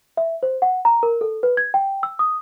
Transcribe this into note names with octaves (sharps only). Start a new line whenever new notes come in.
E5
C5
F#5
A#5
A#4
A4
B4
G#6
G5
E6
D#6